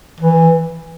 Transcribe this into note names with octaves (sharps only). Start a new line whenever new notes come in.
E3